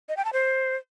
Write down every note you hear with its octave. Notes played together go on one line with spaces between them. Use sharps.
D#5
G5
A5
C5